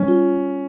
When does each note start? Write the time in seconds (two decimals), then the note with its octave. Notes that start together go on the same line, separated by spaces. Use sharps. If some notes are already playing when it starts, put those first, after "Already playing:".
Already playing: G3 C#4
0.08 F4